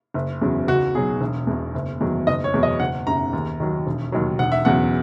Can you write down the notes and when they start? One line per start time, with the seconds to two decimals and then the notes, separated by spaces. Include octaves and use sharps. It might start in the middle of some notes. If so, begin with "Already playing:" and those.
0.14 F#1
0.41 E2 C#3 F#3
0.67 C#2 F#4
0.95 B2 F#3 G#4
1.20 E1
1.47 E2 B2
1.74 F#1
2.00 E2 D#3 F#3
2.27 F#1 D#5
2.44 C#5
2.54 E2 B2 F#3
2.63 D#5
2.80 F#1 F#5
3.07 F#2 C#3 A#5
3.33 D#2
3.60 D#3 F#3
3.86 E1
4.12 D#2 D#3 F#3
4.39 E1 F#5
4.52 E5
4.65 E2 C#3 F#3 F#5